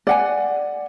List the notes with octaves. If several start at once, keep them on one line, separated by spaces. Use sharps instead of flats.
D5 F#5 G#5